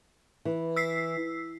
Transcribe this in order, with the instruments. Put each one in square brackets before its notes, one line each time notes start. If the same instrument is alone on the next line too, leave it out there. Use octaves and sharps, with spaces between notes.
[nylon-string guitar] E3
[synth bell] E6 B6 C7